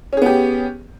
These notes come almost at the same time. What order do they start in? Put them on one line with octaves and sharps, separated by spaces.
C#4 G#4 B3 G4